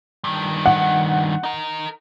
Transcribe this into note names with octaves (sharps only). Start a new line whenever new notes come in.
G2 D#3
F#5
D#4 A#4